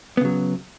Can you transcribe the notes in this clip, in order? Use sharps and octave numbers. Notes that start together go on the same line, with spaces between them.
C#3 F#3 B3